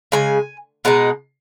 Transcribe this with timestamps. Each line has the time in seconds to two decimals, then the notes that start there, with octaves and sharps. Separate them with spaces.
0.12 C#3 G#3 G#5
0.85 B2 G#3 D#4